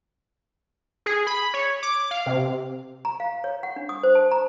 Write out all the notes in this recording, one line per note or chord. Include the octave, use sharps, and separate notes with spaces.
G#4
B5
C#5
D6
F5
C3
A#5
F5
C#5
F#5
D4
D#6
C5
A5
A#5